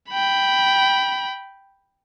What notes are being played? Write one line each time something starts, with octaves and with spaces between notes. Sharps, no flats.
G5 B5